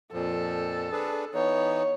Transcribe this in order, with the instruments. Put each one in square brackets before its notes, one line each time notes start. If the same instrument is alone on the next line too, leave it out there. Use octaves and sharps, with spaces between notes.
[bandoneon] F2 A#2 F3 [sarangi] A4
[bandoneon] D4 G#4 B4
[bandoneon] E3 B3 D#4 [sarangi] C#5